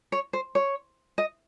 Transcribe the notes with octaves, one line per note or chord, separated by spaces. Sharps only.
C#5
C5
C#5
D#5